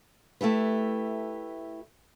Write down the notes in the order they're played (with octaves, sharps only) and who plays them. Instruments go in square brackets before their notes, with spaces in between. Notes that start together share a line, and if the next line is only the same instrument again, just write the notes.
[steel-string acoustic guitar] A3 E4 G4 B4